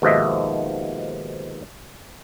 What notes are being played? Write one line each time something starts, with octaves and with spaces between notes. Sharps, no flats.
D#2 G#2 B2 F3 D#5 E5